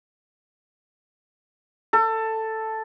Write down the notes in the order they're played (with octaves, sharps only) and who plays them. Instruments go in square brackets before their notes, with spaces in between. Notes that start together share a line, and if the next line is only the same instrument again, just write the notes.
[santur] A4